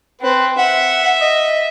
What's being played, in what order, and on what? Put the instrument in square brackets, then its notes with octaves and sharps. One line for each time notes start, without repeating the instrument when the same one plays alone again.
[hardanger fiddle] C4 [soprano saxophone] B4
[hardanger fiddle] E5 [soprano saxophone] F#5
[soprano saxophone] D#5